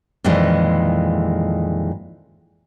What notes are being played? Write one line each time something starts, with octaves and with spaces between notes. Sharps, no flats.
F2 A#2 D#3 E3 G#3